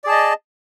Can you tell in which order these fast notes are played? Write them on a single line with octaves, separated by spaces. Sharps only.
D5 G#4 A5 D#5